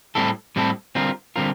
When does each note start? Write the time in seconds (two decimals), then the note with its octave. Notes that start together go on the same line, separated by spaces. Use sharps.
0.15 A2 G3 C4 E4 A4
0.56 A2 G3 C4 E4 A4
0.95 D3 G3 C4 F4 A#4
1.36 D3 G3 C4 F4 A#4